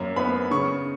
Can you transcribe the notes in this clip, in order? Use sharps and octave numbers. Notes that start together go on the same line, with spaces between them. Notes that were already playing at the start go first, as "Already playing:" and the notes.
Already playing: F#2 A#3
B3 B5
C#3 C#6